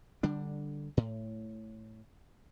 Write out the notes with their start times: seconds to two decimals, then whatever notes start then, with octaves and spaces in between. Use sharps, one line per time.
0.23 D3 G3 D4
0.97 A2